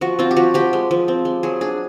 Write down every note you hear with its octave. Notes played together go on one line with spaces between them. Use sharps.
F3 F#4
C4 F4
G4
F3 F#4
F3 G4
G#3
F3
C4
G#3
F#3 G#4
D4 G#4